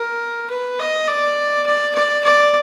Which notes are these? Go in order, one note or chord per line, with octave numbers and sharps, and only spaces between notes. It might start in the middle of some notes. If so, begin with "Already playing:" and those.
Already playing: A#4
B4
D#5
D5
D5
D5
D5